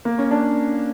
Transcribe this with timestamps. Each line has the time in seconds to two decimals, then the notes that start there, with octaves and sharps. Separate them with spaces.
0.05 A#3
0.18 C#4
0.31 D4